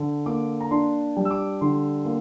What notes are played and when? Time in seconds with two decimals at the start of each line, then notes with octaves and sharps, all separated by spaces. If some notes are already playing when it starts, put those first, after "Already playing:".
Already playing: D3
0.26 A#3 D6
0.60 A#5
0.71 D4 C6
1.17 G3
1.25 E6
1.30 D6
1.61 D3 C6
2.05 A#3